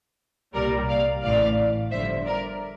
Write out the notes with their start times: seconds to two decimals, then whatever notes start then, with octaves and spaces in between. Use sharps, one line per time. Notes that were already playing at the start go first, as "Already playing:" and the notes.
0.54 C2 A#2 G3 A#4 D5
0.88 D5 F5
1.22 A1 A2 E3 D5 F5
1.91 G1 G2 D3 F3 C5 E5
2.25 A#4 D5